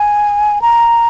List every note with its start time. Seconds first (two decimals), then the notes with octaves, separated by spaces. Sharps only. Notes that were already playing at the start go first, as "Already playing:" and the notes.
Already playing: G#5
0.62 A#5